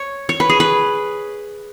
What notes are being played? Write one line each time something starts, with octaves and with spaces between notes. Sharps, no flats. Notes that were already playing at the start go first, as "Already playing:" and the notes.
Already playing: C#5
C#5
B4
G#4
B4